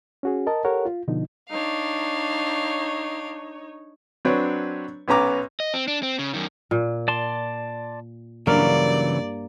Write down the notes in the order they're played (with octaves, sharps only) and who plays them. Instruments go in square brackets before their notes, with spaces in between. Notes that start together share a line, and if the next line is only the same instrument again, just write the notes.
[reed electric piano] C#4 F#4 G#4
A#4 D#5 A5
G4 A4 A#4 C#5 F#5
F4
B2 D3 F3 D#4
[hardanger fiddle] D4 F5 [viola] D#4 C#5
[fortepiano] F#3 C4 D4 B4 C#5
B1 B3 C#4 A#5 D6
[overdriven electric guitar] D#5
C4
D4
C4
C#3
F#2 D#3
[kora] A#2
[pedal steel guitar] D5 A5 C6
[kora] G2 A#3 [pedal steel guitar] C#3 E3 F#3 [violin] D5